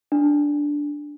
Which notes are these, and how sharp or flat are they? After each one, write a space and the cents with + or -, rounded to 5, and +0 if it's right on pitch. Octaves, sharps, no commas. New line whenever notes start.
D4 -5